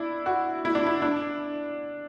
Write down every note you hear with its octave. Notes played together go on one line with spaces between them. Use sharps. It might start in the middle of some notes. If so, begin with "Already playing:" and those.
Already playing: D4 E4
F#4
E4
D4
E4
D4